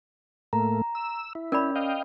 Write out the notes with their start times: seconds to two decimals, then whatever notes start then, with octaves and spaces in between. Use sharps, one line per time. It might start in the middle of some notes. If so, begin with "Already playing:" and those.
0.53 A2 A3 A#3 A#5
0.95 E6
1.35 E4
1.52 C#4 A#4 D5 B5
1.76 D#5 F5 G5